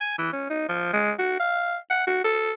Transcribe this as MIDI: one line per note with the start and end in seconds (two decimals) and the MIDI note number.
0.01 0.16 80
0.18 0.30 52
0.33 0.50 61
0.50 0.68 63
0.69 0.89 53
0.93 1.12 56
1.19 1.35 66
1.40 1.77 77
1.90 2.04 78
2.07 2.21 66
2.25 2.52 69